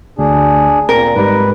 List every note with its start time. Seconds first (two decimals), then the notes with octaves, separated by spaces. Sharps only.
0.18 D2 D4 G#4
0.89 A#2 C4 A#4
1.16 G#2 G3 B4